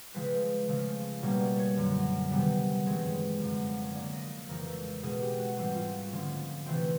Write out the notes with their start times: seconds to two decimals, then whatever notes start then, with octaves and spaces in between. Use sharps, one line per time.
0.14 C#3 F3 G#3 C4 B4
0.68 C#3 F3 A3
1.22 B2 G3 A#3 C#4 C#5
1.40 D5
1.59 C#5
1.77 F#2 D3 F#3
2.31 C3 D#3 G3 B3
2.86 G2 E3 G#3 C4 C#5
3.40 F#2 D3 F3
3.83 C#5
3.93 D3 F3 A#3 C#4 D5
4.12 D#5
4.49 F2 C#3 E3 G#3 A#4
4.66 A4
4.85 A4
5.02 B2 G#3 B3 G#4
5.21 G4
5.38 F#4
5.57 G#2 E3 G3 C4 F#4
5.75 F4
5.93 F#4
6.12 D3 F3 A3 C#4
6.66 C3 E3 A3 C4